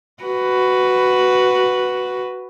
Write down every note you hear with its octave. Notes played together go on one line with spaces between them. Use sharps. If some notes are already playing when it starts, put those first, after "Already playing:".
F#4 B4